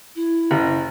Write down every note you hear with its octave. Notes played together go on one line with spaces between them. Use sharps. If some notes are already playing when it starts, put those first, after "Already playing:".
E4
F#1